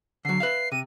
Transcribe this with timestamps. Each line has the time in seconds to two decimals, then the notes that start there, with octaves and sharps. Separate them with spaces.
0.25 D3 F#3 C7
0.40 B4 E5 F5
0.72 C3 D#7